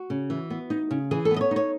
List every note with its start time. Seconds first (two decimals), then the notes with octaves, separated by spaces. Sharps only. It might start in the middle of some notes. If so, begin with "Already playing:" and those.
Already playing: F#4
0.10 C#3
0.30 E3
0.50 B3
0.70 D#4
0.91 C#3
1.11 E3 G#4
1.25 A4
1.31 B3
1.36 D#5
1.41 C#5
1.51 D#4 C#5